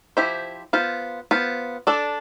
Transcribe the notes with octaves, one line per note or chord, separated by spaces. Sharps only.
F3 A3 E4 G4 C5
B3 F4 C5
B3 F4 C5
D4 A4 D5